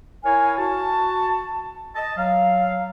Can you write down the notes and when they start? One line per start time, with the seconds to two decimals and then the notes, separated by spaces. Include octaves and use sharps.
0.24 E4 A#4 C#5 F5 G#5
0.58 F#4 A5
1.95 D#5 A5
2.17 F#3 F5